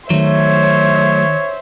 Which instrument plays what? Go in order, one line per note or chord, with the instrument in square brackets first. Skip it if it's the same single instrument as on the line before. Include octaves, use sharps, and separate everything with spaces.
[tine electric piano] D#3 [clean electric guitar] F#3 A3 [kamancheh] C5 E5 [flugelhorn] C#5